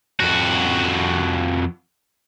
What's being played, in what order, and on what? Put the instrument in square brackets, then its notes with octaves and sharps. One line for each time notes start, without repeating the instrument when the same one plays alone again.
[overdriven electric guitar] F2 F#4